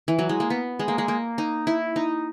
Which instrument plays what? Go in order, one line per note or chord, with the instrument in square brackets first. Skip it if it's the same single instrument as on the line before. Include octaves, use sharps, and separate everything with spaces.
[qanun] E3
F#3
G#3
A#3
B3
G#3
A#3
G#3
A#3
D#4
E4
D#4